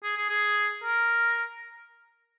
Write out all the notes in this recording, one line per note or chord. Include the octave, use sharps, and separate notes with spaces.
G#4
G#4
G#4
A#4